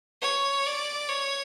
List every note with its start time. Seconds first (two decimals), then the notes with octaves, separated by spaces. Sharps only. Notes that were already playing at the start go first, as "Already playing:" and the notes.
0.22 C#5
0.66 D5
1.09 C#5